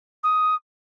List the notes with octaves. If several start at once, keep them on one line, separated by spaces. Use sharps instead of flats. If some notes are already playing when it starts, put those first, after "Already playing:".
D#6